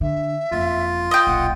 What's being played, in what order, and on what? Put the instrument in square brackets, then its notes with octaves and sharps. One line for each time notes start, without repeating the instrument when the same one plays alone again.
[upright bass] D3 [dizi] E5
[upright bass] F#1 F2 [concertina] F4
[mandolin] D#5 G5 [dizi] D#6
[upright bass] D#1 B1 [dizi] F#5